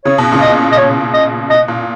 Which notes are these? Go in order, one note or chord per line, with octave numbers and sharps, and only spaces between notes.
C#3 C#5
B2
A#2 C#3
D#5
D#5
C#5
D#5
B2 D#5
A#2